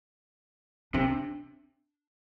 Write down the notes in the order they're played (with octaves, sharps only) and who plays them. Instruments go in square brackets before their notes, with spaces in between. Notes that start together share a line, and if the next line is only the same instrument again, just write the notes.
[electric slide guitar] C3 [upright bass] D4